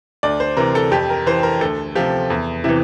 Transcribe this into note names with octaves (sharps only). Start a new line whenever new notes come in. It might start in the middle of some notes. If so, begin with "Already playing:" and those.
D2 D5
C5
C3 E3 A#4
A4
F2 G4
A#4
E3 C5
A#4
D2 A4
C3 F3 G4
E2
C3 E3 E4